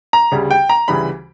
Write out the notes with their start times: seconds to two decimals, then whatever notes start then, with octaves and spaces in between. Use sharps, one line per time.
0.13 A#5
0.32 D2 C#3 G3
0.51 G5
0.69 A#5
0.88 D2 C#3 E3 G3 B5